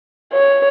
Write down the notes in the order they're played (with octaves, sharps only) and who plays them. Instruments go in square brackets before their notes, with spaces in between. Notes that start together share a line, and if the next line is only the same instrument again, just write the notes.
[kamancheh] C#5